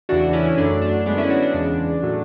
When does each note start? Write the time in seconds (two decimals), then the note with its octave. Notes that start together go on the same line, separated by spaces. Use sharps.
0.09 E2 C#3 E3 A3 D4 F#4
0.33 C#4 E4
0.58 F#2 D3 F#3 A3 D4
0.82 D4
1.06 F#2 D3 G#3 B3 D4
1.18 C#4 E4
1.30 D4 F#4
1.42 D4
1.54 E2 C#3 G#3
2.03 A2 F#3 A3